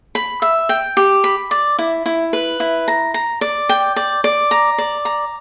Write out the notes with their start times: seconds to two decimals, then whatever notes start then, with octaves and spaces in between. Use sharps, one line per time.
0.15 B5
0.42 E5
0.69 G5
0.97 G4
1.24 B5
1.51 D5
1.79 E4
2.06 E4
2.33 B4
2.60 E4
2.88 A#5
3.14 A#5
3.41 D5
3.69 G5
3.96 D5
4.24 D5
4.51 A#5
4.78 D5
5.05 A#5